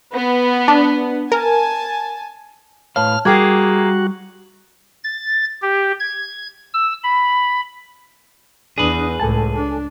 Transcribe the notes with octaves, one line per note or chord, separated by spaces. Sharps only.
B3
D4
A#4 G#5 A5
A2 B4 C#5 F5 A5 F6
G3 A#3 F#4 G#4 G5 D6 G#6
A6
G4
G#6
E6
B5
E2 D4 G#4 B4 D#6
C#2 A2 A4 G#5 A5
D4